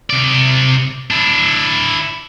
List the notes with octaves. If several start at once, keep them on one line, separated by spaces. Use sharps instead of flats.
C3 D5
D4 E4